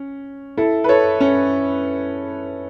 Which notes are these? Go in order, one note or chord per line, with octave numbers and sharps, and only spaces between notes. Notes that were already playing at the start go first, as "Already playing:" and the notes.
Already playing: C#4
E4 A4
B4
A4 C#5
C#4